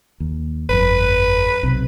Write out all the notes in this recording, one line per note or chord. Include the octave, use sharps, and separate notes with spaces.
D#2
G1 F2 B4
B1 C3